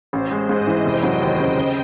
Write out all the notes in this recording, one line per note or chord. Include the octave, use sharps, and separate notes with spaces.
A1 C5
G#3
G#2 D#5
E3
F1 G5
F#3
D#2
C#3
C#3